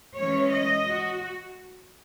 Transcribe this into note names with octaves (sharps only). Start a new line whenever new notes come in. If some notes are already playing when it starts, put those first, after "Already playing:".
E3 G#3 C#4 C#5
D#5
F#4